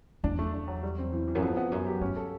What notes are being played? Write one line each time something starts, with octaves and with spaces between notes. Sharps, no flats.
E2 D4
A3
D4
F#3
G3
C4
E3
E3
F#2
F2 B3
B3
F#2 B3
G4
G2 C#4
A4